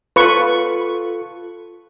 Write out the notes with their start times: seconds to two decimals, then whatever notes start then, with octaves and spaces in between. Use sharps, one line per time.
0.16 F4 A4 B4 C#6